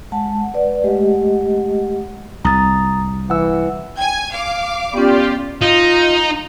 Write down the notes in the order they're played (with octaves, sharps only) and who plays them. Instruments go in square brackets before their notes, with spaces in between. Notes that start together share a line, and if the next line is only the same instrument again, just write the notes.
[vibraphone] G#3 F#5 A5
B4 D5 F#5
G#3 A3 G4 D#5 F#5
[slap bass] C2 [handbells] A#5 D#6 A6
[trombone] E3 [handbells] F#5 E6
[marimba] G5 [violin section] G#5 G#6
[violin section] F5 D6
[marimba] B3 C#4 [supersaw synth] F4 G4 [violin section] D5
[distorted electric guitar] D#4 [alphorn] F4